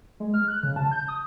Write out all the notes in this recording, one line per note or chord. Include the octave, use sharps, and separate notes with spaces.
G#3
F6
F#6
C#3
A5
G6
D#6